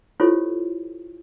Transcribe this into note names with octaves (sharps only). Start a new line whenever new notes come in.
E4 F4 G4 A4 C5 C#5